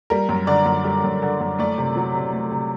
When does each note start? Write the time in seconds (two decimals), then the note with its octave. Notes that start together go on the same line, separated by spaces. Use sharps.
0.10 G3 A#4
0.29 F#2
0.47 D3 D5
0.66 F#2
0.85 G3
1.04 F#2
1.22 D3
1.41 F#2
1.59 A3 D5
1.78 C3
1.96 F#3
2.15 C3
2.33 A3
2.51 C3